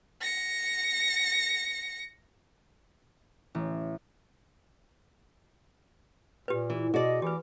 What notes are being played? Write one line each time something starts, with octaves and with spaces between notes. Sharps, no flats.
A#6 C#7
A1
A#2 G4 B4
E3
B2 F#4 G#4 D5 D#5
E3 G4 B4 D6